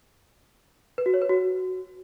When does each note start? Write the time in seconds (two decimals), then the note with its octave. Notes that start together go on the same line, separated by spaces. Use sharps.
0.98 B4
1.06 F#4
1.14 C#5
1.22 B4
1.29 F#4